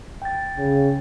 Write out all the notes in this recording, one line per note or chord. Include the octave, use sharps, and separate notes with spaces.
G5 A6
C#3